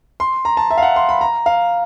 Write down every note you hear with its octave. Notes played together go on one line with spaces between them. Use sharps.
C6
A#5
A5
E5
F5
F#5
C6
B5
A#5
F5